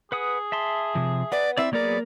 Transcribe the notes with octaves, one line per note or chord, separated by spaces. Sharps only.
G#4 B4 F#5 D#6
E5 A5 C6
C3 F3
B4 D5 F#5
C4 E4 D5 E5
F#3 A#3 B3 G#4 A#4 D5